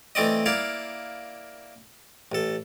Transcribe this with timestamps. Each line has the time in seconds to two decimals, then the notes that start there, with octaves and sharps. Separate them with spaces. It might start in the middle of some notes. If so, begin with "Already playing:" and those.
0.15 E3 A3 C4 D5 D#5
0.46 A#3 E4 D5 F5
2.32 A1 A4